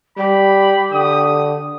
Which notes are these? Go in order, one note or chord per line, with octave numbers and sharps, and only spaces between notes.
G3 G4 B5
D3 D#6